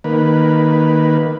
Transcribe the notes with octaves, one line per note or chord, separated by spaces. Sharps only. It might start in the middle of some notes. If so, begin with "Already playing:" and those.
D#3 A#3 B4